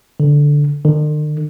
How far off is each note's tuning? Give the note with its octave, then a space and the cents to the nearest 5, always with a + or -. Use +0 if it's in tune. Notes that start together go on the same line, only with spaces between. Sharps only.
D3 -10
D3 +45